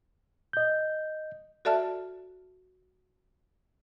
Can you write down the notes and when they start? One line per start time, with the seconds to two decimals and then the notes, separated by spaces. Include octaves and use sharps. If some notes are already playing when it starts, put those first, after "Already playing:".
0.53 D#5 G6
1.65 F#4 A4 D5 E5 A5 F6